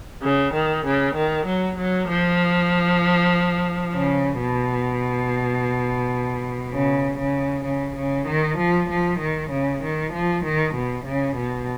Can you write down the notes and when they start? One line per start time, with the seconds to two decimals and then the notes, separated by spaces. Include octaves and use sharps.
0.23 C#3
0.54 D#3
0.85 C#3
1.15 D#3
1.46 F#3
1.78 F#3
2.09 F3
3.94 C#3
4.40 B2
6.72 C#3
7.18 C#3
7.65 C#3
7.96 C#3
8.27 D#3
8.58 F3
8.89 F3
9.19 D#3
9.50 C#3
9.82 D#3
10.12 F3
10.43 D#3
10.74 B2
11.05 C#3
11.36 B2